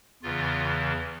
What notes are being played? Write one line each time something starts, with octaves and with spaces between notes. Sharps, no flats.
E2 C#3 E3 F4